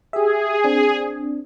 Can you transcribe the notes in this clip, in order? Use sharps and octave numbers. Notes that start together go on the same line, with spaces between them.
G4 G#4 E5
C4 D4